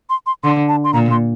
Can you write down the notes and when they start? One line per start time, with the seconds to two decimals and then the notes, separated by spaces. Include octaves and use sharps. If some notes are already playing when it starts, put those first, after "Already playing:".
0.10 C6
0.26 C6
0.43 D3 C6
0.69 A5
0.84 C6
0.93 A#2 A#5
1.11 C6